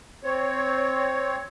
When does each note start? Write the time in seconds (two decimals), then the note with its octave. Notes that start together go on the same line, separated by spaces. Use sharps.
0.24 C4 C#5